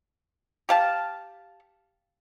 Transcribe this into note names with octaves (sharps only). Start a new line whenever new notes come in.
G4 F5 A5